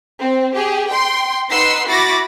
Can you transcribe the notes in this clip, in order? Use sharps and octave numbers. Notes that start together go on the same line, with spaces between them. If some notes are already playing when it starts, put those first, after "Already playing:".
C4
G4 G#4
G5 C6
D#4 B4 F#5 C6 E6 C7
E4 F#4 B5 D6 A6 A#6